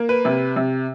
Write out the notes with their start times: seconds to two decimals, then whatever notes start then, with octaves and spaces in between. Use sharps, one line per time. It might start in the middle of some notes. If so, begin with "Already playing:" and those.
Already playing: A#3
0.09 B4
0.25 C3
0.56 C3